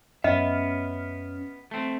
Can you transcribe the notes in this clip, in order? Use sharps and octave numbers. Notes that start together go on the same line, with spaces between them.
F#2 B3 C#4 D#5 E5 F6
A3 C4